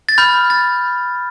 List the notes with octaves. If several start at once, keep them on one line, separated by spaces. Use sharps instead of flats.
A6
B5 F6 G6
A6